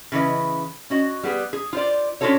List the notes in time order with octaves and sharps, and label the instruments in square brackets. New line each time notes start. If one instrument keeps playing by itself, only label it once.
[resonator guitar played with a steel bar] C#3 E3 B4 D#5
C#4 F#4 D#5
G3 B3 G#4
G#4
F4 C5 D5
C#4 D4 F4 F#4 A4 C#5